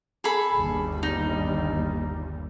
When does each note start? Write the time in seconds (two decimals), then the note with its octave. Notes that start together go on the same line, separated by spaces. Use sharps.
0.24 G#4 A4 B5
0.55 G1 D#2 G3
1.03 D#4